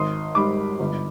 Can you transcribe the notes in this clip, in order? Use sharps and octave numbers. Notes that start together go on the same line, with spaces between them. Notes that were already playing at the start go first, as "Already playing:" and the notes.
Already playing: G#1 C6 D#6
G#2 G3 B5 D6
G1